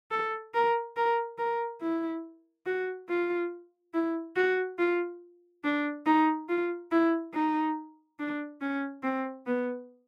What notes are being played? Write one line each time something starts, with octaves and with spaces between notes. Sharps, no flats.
A4
A#4
A#4
A#4
E4
F#4
F4
E4
F#4
F4
D4
D#4
F4
E4
D#4
D4
C#4
C4
B3